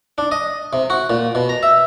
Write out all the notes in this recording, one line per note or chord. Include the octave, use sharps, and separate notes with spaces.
D4
D#5
C3
F#4
A#2
B2
A#5
E5